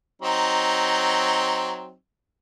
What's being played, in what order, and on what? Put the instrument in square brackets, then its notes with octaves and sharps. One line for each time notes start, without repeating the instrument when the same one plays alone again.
[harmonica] F#3 C4 D#4